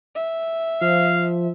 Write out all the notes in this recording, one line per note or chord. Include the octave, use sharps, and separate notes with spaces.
E5
F3 F5